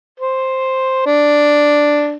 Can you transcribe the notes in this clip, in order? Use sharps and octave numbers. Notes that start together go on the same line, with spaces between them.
C5
D4